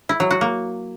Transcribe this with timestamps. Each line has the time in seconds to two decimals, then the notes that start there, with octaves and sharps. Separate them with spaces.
0.09 E4
0.20 F#3
0.31 F#4
0.41 A#3